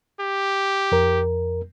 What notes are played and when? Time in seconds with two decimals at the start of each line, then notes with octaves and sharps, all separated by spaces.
0.20 G4
0.92 F2 A#4